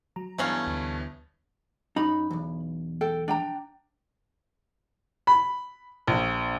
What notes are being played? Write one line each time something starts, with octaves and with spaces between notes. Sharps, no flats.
F#3 A#5
G2 E3 A3 B3 C#4 F5
D2
F#2 D#4 B5
B1 E2
A4 G5
D4 G5 A#5
B5
A#1